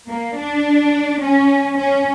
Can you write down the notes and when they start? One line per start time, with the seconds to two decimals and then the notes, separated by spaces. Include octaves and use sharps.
0.08 A#3
0.37 D4
1.22 C#4
1.78 C#4